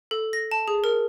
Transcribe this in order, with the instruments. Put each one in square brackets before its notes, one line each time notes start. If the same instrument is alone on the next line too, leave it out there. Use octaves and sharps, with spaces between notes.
[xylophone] A4
A#6
A5
G#4
A#4